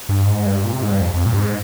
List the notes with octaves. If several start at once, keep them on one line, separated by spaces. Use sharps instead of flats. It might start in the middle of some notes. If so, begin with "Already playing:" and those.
G2
G#2
G2
A#2
C3
G#2
G2
F2
F2
A#2
G2
G#2